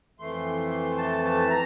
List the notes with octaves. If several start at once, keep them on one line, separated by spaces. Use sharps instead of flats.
F2 E3 A3 C6
A5
A5
A#5